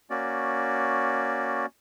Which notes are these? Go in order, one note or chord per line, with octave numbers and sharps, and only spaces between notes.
A#3 C#4 F#4 D5